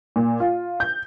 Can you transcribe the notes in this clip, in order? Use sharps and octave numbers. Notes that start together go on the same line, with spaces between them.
A#2
F4
G6